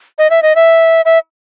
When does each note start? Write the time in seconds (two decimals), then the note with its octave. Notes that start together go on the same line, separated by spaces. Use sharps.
0.19 D#5
0.30 E5
0.43 D#5
0.56 E5
1.05 E5